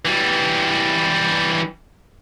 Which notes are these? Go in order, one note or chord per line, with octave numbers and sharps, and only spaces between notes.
E3 G3